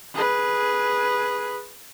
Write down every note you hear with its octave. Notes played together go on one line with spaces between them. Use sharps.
G#4 B4